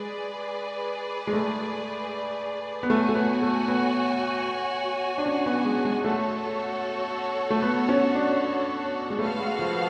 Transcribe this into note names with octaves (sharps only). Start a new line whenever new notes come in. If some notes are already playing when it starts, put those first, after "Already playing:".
Already playing: G#3 G#4 B4 D5
G#3
A3
B3
A3 F#4 C#5 G#5
A3
B3
A3
B3
D4
C#4
B3
G#3
G#3
A3 F#4 A4 C#5
A3
B3
C#4
D4
G#3
A3 B3 F#4 A4 F5
G#3
F3